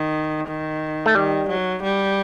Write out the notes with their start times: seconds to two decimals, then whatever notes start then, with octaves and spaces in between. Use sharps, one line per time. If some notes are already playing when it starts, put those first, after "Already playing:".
Already playing: D#3
0.47 D#3
1.06 A3
1.15 D#3 G3
1.48 F#3
1.83 G3